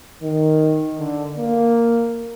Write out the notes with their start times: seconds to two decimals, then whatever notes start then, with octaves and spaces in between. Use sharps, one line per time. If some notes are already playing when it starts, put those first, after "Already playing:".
0.22 D#3
0.99 D3
1.37 A#3